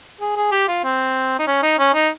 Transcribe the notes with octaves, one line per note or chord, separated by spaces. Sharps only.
G#4
G#4
G4
F4
C4
D#4
C#4
D#4
C#4
D#4